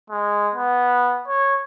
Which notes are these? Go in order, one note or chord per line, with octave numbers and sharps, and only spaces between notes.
G#3
B3
C#5